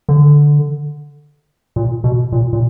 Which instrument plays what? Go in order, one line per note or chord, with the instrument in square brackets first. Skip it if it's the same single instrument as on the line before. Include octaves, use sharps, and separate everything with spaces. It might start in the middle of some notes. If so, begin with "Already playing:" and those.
[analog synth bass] D3
A#2
B2
A#2
A#2